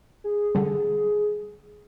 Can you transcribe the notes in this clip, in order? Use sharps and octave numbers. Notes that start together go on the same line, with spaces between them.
G#4
D3 G3